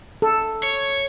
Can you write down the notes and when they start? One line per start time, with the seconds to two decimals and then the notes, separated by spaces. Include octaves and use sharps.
0.22 A4
0.63 C#5